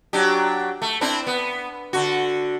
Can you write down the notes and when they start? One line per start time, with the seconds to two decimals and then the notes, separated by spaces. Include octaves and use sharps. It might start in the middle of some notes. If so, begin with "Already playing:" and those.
0.13 F#3 D4 G4
0.82 A3
1.01 C4 D4 E4
1.27 B3
1.93 D3 F#4